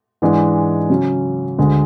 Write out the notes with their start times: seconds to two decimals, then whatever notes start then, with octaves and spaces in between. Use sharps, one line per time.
0.22 G#2 E3 G#3 D4
0.90 C#3 F#3 C#4
1.59 D2 D3 G#3